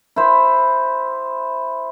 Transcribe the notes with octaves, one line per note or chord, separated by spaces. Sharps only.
E4 C5